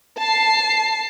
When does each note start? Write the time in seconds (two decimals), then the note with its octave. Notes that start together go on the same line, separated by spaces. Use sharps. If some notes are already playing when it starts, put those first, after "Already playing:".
0.19 A5 C7